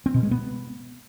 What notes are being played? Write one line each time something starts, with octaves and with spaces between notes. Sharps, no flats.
C4
B2
G#3
B3